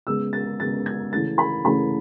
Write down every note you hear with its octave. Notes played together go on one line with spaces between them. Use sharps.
C#3 G#3 B3 E6
A6
C#3 G#3 B3 A6
G#6
C#3 E3 A3 C#4 A6
B5
C#3 E3 A3 C#4 B5